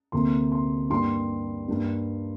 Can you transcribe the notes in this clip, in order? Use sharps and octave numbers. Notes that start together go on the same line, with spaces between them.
D2 C3 A#3 C6
C6
G2 G3 A#3 C6
G2 G3 A#3